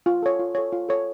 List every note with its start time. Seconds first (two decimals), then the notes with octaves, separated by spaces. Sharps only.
0.06 F4
0.23 A4 C#5
0.39 F4
0.55 A4 C#5
0.73 F4
0.89 A4 C#5